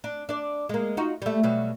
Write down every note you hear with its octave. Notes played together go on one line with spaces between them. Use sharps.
D4
D4 D5
G#3 A#3
D#4 F4 F#4
G3 A3
B2 F#3 G3